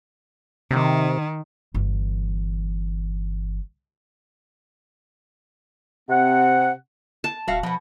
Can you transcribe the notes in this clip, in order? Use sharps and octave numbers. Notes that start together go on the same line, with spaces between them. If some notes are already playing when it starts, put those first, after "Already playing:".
C3 D#3
G1 E3
C3 C4 F#5
A5
D#1 F#4 E5 F5
B2 F3 B3